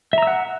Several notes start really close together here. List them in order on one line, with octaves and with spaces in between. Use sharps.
E5 A#5 E6 F#5